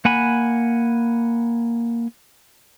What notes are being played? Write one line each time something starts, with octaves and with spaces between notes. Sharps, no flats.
A#3 F#5 G#5 B5